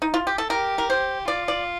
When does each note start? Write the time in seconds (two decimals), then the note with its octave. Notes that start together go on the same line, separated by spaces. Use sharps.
0.02 D#4
0.14 F4
0.27 G4
0.38 A4
0.50 G4 A#4
0.78 A#4
0.90 C5
1.28 F4 D5
1.48 D5